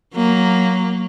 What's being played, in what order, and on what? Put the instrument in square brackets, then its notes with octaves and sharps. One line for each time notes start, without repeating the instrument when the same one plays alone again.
[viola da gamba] F#3 A#3